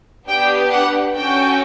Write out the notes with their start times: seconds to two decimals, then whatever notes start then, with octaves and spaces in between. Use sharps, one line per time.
0.27 B3 D4 G4 G5
0.71 F#5
1.15 C#4 F#4 A4 G5